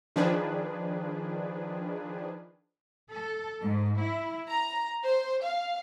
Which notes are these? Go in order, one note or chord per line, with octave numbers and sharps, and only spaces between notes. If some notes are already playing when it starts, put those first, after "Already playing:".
D#3 F3 D4 G#4 B4
A4
G#2
E4
A#5
C5
F5